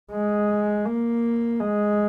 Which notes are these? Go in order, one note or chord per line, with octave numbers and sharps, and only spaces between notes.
G#3
A#3
G#3